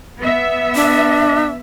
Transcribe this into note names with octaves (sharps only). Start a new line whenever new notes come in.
B3 E5
D4